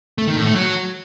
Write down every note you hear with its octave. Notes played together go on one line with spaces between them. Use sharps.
A3
D#3
A2
A3
F#3